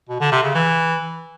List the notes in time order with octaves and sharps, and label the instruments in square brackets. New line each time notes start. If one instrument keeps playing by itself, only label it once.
[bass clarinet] B2
D3
C3
C#3
E3